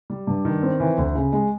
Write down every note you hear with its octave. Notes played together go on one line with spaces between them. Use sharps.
G3
G2
D#3
C4
E3
D2
C#3
G#3